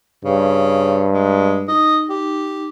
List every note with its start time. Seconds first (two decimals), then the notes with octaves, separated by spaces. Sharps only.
0.25 G2 C#3
1.11 G#3
1.68 D#4 D#5
2.10 G4